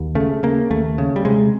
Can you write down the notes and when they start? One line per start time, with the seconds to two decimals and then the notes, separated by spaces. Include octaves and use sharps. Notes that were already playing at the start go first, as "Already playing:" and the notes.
Already playing: D#2
0.15 C#3 A3
0.43 C#3 A#3
0.70 D#2 A3
0.98 C#3
1.16 G3
1.25 C3 G#3